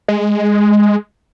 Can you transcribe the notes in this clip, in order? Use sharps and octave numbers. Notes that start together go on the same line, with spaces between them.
G#3